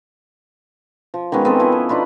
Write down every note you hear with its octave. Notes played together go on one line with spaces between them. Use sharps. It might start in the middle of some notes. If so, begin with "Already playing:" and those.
F3
D#3 G#3 B3 C#4
B3 C4 A4
F3 C#4 E4
C5
D4 D#4 F4 B4